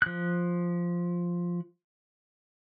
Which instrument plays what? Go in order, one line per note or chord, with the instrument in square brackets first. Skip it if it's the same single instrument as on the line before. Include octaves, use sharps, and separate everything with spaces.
[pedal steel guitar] F3 F#6